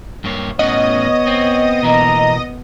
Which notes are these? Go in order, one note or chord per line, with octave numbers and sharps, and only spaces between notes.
G2 A#3 C#5
A2 B3 C#4 C#5 D#5 F#5
C4
B2 E3 A#3 A#5